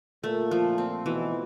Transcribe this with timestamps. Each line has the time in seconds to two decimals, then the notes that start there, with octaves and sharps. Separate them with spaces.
0.24 A#2 A3
0.51 F3
0.78 C4
1.05 B2 E3